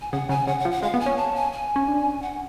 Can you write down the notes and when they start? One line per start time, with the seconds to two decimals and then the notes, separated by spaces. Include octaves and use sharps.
0.02 G#5
0.12 C#3 F#5
0.29 C#3 G#5
0.47 C#3 F#5
0.60 F#5
0.65 F3
0.71 F#5
0.82 G#3 F5
0.94 B3
1.00 G#5
1.06 C#4
1.17 A5
1.35 G#5
1.52 G#5
1.76 C#4
1.88 D4
2.22 F#5